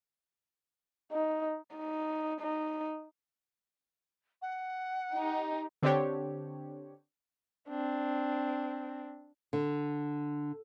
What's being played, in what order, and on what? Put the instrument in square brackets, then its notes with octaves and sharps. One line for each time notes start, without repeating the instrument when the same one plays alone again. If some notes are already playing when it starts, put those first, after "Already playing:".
[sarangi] D#4
D#4
D#4
[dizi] F#5
[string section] D#4 G4
[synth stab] D3 C4 D4 G4 C#5
[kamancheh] C4 D4
[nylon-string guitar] D3